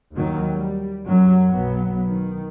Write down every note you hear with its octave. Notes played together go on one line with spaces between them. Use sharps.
D#2 D#3 F#3
G3
F#2 F#3
B1 F#3 B3
D#3